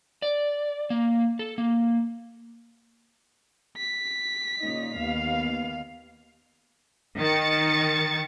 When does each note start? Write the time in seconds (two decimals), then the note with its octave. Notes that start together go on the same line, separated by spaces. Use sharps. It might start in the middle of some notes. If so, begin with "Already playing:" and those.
0.22 D5
0.90 A#3
1.39 A4
1.58 A#3
3.77 B6
4.59 A#2 C#3 D#4
4.96 D#2 B3 F5
7.18 D#3 A6 C#7